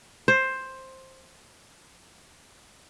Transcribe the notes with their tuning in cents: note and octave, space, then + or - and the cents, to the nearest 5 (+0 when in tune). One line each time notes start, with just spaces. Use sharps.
C5 +10